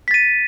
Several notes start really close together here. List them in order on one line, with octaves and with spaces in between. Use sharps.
B6 A6 D#7